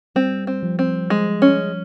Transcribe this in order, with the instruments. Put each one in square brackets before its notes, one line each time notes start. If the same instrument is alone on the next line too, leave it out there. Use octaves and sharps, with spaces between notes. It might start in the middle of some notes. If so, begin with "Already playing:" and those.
[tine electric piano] G3 [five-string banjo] C4
[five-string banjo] C4
[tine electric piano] F3
[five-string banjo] C4
G#3
C#4